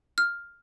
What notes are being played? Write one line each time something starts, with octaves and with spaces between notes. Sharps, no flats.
F6